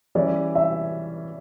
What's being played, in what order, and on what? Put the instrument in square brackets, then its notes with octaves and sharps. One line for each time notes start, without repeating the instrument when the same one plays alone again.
[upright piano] E3 G3 C#4 [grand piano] D5
[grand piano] E5